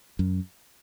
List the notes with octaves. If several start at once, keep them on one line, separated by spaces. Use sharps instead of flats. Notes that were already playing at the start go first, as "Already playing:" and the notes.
F#2